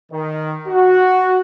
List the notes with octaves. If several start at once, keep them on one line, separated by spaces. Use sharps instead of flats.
D#3
F#4